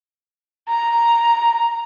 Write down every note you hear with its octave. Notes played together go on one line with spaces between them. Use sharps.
A#5